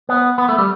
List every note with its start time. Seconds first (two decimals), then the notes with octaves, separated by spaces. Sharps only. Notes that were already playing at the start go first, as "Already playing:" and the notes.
0.09 B3
0.38 B3
0.49 A3
0.58 G3